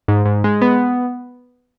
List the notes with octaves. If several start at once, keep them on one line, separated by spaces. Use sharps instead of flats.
G#2
G#2
G#3
B3